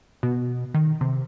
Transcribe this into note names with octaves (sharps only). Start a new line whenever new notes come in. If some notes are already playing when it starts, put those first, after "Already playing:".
B2
D#3
C3